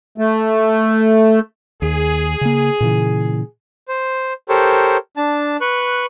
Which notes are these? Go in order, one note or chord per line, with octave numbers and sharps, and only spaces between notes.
A3
D#2 G#4
C#3 A#3
A#2 C#3 E3
C5
G4 A4 A#4 C5 C#5
D4 A5
B4 C#6 F#6